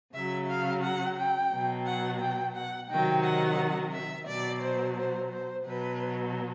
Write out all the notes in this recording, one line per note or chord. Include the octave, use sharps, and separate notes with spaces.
C#3 F#3 E5
F5
F#5
G5
B2 F#3
F#5
G5
F#5
C3 D#3 F#3 G5
F#5
E5
B2 F#3 D5
C5
C5
C5
B2 F#3 B4